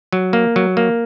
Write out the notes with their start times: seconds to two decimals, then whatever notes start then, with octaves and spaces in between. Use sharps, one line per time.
0.13 F#3
0.33 A#3
0.56 F#3
0.77 A#3